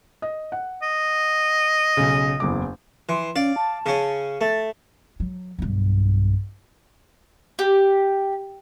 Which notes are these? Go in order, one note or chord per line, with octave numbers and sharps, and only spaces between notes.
D#5
F#5
D#5
B1 C#3
F#1 E2 D6
E3 C6
C#4 D5 F5
A5
C#3 C#4
A3 A6
F#3
B1 G2
G4